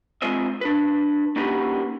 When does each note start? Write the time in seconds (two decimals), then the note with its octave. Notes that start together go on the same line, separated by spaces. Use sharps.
0.22 G#3 C4 F4 C5 D#5 E5
0.61 D4 B4
1.36 A#3 C#4 D#4 F#4 G4 B4